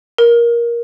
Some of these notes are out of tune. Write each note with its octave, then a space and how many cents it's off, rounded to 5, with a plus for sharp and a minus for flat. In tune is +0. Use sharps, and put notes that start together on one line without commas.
A#4 +15